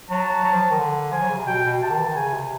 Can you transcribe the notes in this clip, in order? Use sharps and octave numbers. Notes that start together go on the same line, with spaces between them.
F#3 A5
F#3
F3
D#3
D3
F3 G#5
F#3
C#3
C3
B2 G5
B2
C3 A5
D#3
E3
D#3
C#3 G#5
C3